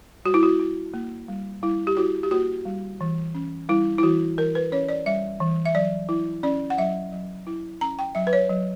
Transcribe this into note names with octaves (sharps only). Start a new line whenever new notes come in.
G3 F#4
E4
F#4
E4
A#3
G3
G3 E4
G4
E4 F#4
G4
A#3 F#4
G3
E3
C#4
G3 E4
E4
E3 F#4
E3 A#4
B4
C#4 C#5
D5
G3 E5
E3
E5
F#3 D5
E4
C#4 D5
F#5
F#3 E5
F#3
E4
C#4 A#5
G5
F#3 E5
B4
C#5
F#3